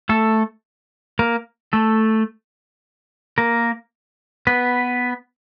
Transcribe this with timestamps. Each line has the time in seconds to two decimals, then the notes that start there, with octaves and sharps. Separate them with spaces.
0.09 A3 A4
1.19 A#3 A#4
1.73 A3 A4
3.38 A#3 A#4
4.47 B3 B4